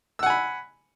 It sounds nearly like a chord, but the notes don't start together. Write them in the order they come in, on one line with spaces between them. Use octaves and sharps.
E6 F#5 G#5 B5